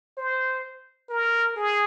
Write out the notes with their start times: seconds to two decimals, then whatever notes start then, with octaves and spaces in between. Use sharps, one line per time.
0.17 C5
1.10 A#4
1.56 G#4